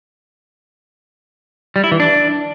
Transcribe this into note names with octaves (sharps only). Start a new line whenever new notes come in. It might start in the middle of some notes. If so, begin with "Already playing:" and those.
G3
E4
E3
D4